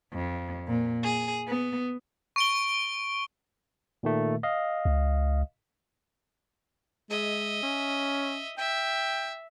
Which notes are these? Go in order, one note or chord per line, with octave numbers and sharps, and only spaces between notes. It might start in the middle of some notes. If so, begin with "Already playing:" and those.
F2
A#2
G#4
B3
C#6 D7 G7
A#2 D#3 A3
D#5 F5
C#2
G#3 D#5 E5
C#4
E5 G5